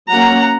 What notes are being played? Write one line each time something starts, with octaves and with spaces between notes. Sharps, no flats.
F#3 A#3 C#4 F#5 A#5